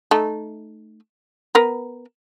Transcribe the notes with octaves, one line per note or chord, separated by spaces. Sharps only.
A3 D#4
B3 A#4 B4